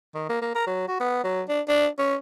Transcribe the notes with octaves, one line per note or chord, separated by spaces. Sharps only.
D#3
A#3
A#3
A#4
F#3
F#4
B3
F#3
D4
D4
C#4